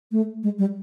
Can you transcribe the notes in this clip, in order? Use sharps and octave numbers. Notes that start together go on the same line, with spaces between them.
A3
G#3
G3